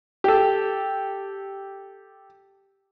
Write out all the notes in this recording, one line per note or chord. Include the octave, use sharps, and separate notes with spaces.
G4 A4